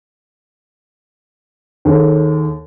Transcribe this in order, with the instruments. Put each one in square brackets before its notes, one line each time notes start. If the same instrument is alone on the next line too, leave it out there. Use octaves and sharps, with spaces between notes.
[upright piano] D#2 G#4 A4